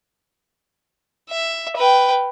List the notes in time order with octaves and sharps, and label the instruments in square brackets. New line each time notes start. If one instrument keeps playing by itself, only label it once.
[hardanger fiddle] E5
B4 G5